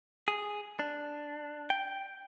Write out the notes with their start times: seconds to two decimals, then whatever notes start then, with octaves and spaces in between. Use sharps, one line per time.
0.28 G#4
0.79 D4
1.70 G5